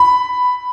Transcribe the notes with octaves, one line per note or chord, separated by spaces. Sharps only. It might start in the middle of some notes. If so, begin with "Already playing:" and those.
Already playing: B5